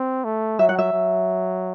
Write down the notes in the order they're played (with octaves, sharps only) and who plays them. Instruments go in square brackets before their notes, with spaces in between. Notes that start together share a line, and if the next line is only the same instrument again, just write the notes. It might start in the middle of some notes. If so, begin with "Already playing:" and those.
Already playing: [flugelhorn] C4
A3
[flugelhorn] F#3 [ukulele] E5
[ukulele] F#5
E5
[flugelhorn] F#3